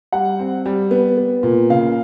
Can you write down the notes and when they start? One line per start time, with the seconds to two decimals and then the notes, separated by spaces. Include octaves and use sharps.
0.12 G3 F#5
0.39 C4
0.66 G3
0.91 B3
1.17 B3
1.43 A#2
1.70 C#3 F5